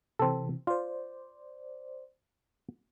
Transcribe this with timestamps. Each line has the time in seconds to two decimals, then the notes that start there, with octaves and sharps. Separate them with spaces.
0.19 C3 E3 C4 A4
0.67 F4 C5 D5